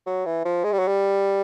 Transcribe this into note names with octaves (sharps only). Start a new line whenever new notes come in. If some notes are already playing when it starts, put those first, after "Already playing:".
F#3
E3
F3
G#3
G3
F#3
G3